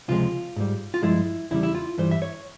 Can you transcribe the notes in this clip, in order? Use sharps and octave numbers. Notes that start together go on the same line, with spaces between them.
C#2 C3 F3 G#3 F4
G#2 G3
F4
G2 F3 G#3 E4
E2 C#3 G3 E4
E4
F4
G2 E3 G3 C5
E5
C#5